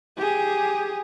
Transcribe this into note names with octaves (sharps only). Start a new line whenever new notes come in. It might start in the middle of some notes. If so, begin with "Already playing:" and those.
G4 G#4